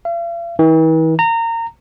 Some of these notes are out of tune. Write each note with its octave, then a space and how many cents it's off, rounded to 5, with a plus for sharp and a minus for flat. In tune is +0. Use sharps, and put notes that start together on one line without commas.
F5 -45
E3 -45
A#5 -25